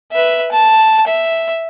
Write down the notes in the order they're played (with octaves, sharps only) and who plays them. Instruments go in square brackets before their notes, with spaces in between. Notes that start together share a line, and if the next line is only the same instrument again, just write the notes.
[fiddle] B4 E5
A5
E5